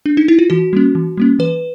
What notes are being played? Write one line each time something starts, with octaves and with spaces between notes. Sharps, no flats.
D4
D#4
E4
F4
E3 F#4
G3 A#3 C#4
E3
G3 A#3 C#4
E3 B4